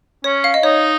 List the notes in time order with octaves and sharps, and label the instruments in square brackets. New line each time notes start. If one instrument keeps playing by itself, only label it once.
[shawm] C#4 [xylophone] C#5
[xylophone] F5
D#5
[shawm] D#4 [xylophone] C#5